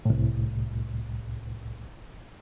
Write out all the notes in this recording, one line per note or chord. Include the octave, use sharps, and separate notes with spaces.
C2 A2